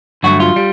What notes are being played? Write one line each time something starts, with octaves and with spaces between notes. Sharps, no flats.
G2 D3 F#3 A3 F#4
F4
G3